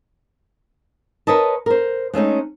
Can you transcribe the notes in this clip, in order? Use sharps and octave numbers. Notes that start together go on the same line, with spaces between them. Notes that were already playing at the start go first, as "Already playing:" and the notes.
A#4 B4 C#5 D#5 A5
A#4 C5
G#3 A3 C#4 D#4